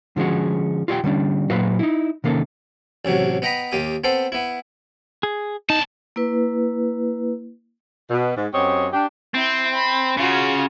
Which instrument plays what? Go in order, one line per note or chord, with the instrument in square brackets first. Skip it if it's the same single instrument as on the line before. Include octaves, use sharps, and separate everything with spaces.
[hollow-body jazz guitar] D3 F3 G#3 C#4 F#4
F4 G4 C#5 F5 G5
D3 G3 C#4 D4
A#2 F#3 F#4 B4 C5 F5
D#4 E4
C3 D#3 A#3 C#4 A4
[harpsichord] A1 A2 C3 F#3
B3 D#5 G5 A#5 B5
D#2 A#3 G4 D#6
B3 C4 A4 C5
B3 E4
[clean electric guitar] G#4
[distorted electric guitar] E2 A5 [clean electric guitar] D#4
[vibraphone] A#3 E4 B4
[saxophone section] B2
G#2
F#2 C4 G4 C#5 D#5
D4 G4
[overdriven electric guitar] C4 [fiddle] E4 G5
[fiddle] B5
[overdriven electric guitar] C#3 [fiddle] F4 F#4